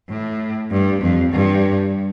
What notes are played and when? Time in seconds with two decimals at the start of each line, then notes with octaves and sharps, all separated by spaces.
0.09 A2
0.71 G2
1.01 F2
1.31 G2